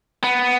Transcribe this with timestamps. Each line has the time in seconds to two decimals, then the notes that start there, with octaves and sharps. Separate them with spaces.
0.24 B3